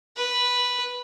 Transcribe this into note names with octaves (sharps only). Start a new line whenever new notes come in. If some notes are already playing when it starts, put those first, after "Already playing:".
B4